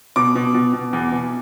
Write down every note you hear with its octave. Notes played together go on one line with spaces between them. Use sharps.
B2 D6
B2
B2
B2
E2
B2